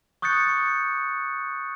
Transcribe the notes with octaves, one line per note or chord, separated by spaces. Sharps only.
C#6 D#6 F#6 G6 A6 C#7